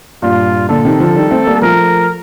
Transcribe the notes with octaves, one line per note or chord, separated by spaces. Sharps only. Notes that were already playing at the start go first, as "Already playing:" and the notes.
G2 A#2 F4
A#2 D3 A4
C3 D#3
D3 F3
D#3 G3
A3 C4
G3 A#3
F3 A3 A#4